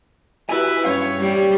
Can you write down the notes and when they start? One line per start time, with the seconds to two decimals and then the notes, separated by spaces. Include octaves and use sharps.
0.49 E4 F#4 G4 B4 G#5
0.84 G2 C#4 C#5 F5
1.20 G3 G4